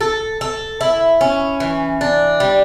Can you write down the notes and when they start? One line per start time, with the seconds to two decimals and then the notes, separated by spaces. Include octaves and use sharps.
0.01 A4
0.41 A4
0.81 E4
1.21 C#4
1.60 E3
2.01 D4
2.40 G3